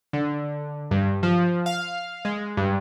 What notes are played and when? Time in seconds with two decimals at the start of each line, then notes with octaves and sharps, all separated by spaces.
0.13 D3
0.91 G2
1.23 F3
1.66 F5
2.25 G#3
2.57 G2